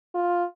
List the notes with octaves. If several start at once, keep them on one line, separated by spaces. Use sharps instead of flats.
F4